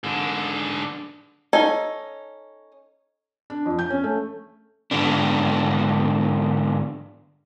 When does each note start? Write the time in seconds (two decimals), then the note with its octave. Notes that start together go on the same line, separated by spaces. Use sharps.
0.04 G#2 D3
1.53 C#4 D#4 A4 G#5
3.50 D4
3.65 F2
3.79 G6
3.90 C#4
4.04 A3
4.91 G#2 D3 B3 D4